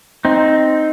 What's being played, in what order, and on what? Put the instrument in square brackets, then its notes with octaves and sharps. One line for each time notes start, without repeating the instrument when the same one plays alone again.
[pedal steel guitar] C4 D#4